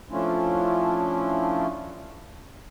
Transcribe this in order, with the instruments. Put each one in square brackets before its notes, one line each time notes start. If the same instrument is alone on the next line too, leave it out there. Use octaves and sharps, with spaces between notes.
[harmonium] F3 A3 C#4 D4 E4 F4